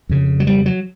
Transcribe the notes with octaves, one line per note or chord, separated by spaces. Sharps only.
F2 C#3
F#3
G3
F#3